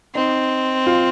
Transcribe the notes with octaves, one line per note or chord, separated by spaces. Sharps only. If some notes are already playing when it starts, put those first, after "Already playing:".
C4 D#4
F4